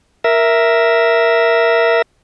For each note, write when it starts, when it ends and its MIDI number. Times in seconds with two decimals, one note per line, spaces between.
0.24 2.02 70
0.24 2.02 76